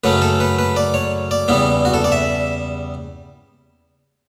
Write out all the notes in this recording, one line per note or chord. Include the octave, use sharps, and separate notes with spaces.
F#2 C#3 F#3 A3 C#4 B4
A4
B4
B4
D5
C#5
D5
E2 C#3 G3 B3 E4
F#4
A4
D5
E5